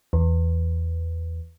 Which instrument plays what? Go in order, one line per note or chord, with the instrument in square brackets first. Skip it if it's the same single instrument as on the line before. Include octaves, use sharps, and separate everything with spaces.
[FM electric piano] E2